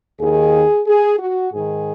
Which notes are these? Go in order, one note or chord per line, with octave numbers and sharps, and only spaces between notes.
D#2 D#3 G#4
G#4
F#4
G#2 D#3 G#4